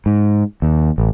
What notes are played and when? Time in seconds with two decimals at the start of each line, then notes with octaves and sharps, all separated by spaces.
0.06 G#2
0.62 D#2
0.98 A1